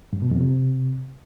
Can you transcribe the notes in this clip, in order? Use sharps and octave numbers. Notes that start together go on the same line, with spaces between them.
G2
B2
F2
C3